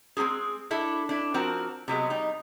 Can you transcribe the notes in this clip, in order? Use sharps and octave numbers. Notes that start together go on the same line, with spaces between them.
G#3 C4 D#4 G4 G#4
D4 E4 A4
D4 E4
F3 C4 F#4 A#4
C3 F#3 G#3 B3
G3 D#4